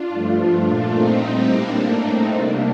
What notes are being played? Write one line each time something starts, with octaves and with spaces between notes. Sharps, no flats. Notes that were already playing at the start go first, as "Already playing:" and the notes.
Already playing: D4 F4
G2 F3 A3
A#2 A3
C4 D#4
A2 G3
A#3 D4
A2 A3 A#3 D4
C4 D#4
C3 G3 A#3 D4